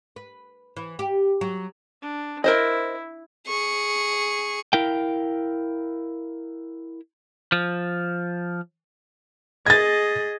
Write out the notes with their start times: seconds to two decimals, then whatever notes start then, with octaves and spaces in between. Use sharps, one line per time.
0.16 B4
0.77 E3
0.99 G4
1.41 F#3
2.02 D4
2.44 E4 A#4 C5 D#5
3.47 G#4 C#6
4.73 E4 A#4 F5 G5
7.52 F3
9.66 G#4 D#5 G#6 A6